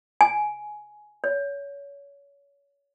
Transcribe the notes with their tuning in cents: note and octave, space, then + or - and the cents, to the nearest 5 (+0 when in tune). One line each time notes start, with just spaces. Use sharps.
G#5 +15
C#5 +30